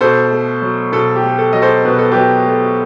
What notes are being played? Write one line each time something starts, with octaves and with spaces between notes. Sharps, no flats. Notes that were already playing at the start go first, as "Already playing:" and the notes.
B2 A4 C5
A3
F#3
B2 A4
G4
A3
A4
F#3 D#5
A4 C5
B2 B4
A4
F#3 G4 B4
A3